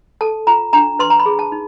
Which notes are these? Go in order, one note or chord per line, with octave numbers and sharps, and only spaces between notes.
A4 A5
F4 A#5
D4 A#5
B4 C6
A#5
B5
G#4
A5
D#4